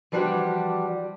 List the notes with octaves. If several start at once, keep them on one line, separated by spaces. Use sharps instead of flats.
E3 F3 G3 D4 F#4 G4